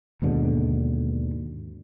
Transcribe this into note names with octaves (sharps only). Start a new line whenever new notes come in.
D#2 G#2 B2 D3